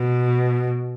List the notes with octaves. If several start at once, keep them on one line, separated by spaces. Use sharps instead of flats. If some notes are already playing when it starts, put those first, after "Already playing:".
Already playing: B2